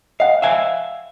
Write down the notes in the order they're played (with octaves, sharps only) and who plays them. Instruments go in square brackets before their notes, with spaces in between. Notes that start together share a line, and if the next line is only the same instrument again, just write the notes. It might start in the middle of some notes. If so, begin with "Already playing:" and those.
[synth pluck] D#5 F#5 [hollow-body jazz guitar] F5
[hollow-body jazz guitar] E5 F5 G#5